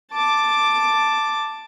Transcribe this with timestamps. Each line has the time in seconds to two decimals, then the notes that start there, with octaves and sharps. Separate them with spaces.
0.12 A5 D6